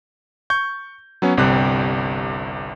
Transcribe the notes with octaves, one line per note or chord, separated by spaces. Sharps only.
C#6 G6
F#3 B3 C#4
G1 C2 C3 G3 F#6